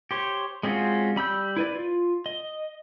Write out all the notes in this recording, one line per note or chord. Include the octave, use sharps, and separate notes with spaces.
G4 C5 C#5
G#3 C4 C#4 F4 F#4
G3 B5 E6 G6
E4 B4 D5
F4
D#5